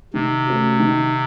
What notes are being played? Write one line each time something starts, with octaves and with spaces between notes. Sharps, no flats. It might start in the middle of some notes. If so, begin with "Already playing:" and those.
C3 D#3
A3 C#4 F#4
D#3